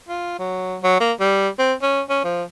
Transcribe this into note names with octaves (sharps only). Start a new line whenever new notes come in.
F4
F#3
F#3
A#3
G3
C4
C#4
C#4
F3